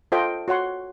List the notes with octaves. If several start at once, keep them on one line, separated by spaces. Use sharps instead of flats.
F4 A4 C5 D#5 G5
F#4 C#5 F#5 C6